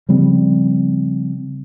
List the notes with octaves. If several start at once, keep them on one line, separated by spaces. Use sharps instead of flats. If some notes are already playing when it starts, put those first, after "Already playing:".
C#3 F3 G3 C4